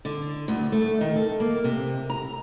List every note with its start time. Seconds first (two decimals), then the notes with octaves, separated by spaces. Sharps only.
0.05 D3
0.48 D2
0.72 A3
1.01 D#3
1.16 A4
1.40 A#3
1.64 C3
2.10 A#5